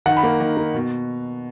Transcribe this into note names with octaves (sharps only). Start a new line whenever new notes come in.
D#3 F#5
B5
A#3
D#3
A#3
B2